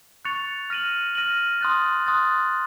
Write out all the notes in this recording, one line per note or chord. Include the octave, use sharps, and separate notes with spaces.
C#6 F#6 A6 C#7 F7
F6 A#6 D#7 F#7
F6 A#6 D#7 F#7
C6 D#6 F#6 A6
C6 D#6 F#6 A6